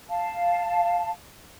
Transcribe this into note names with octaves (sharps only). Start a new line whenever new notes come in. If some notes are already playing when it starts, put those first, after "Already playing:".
F5 A5